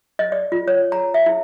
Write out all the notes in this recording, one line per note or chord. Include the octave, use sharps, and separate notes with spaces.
D#5
D5
F4
C#5
A#5
E5
E4